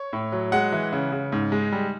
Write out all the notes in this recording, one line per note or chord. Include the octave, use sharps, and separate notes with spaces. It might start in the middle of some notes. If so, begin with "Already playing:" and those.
Already playing: C#5
A2
F#3
G#3 F#5
E3
C#3
C#3
G#2
G#3
G3